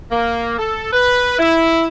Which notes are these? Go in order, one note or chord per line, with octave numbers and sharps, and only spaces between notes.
A#3
A4
B4
E4